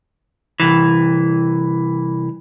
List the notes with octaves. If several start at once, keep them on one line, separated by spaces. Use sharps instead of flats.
C2 E3